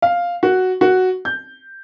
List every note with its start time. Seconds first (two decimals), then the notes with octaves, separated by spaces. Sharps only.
0.02 F5
0.43 F#4
0.81 F#4
1.25 G6